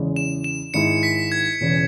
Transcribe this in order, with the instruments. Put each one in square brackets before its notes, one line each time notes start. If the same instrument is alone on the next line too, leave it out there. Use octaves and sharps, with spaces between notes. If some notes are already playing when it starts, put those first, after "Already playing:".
Already playing: [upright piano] E2 C#3 G#3
[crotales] E7
E7
[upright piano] G#1 G#2 G#3 E4 [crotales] C#7
[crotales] B6
G#6
[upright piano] E1 E2 C#3 E3